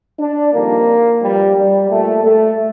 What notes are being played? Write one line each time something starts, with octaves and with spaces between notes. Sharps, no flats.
D4
F2 D#3 G3 A#3
G2 F3 G3
G3
A#2 G3 A3
A3